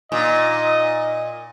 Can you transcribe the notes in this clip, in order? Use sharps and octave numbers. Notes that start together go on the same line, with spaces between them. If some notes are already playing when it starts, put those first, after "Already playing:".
A#2 D#4 D#5